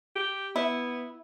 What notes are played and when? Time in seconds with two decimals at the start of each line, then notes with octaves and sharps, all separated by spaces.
0.16 G4
0.56 B3 E4